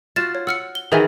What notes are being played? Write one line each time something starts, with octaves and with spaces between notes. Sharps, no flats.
F4 F#4 A6 E7
C#5
F#5 E6 F6 C#7
G7
D#3 E3 F#4 G#4 E5 G#5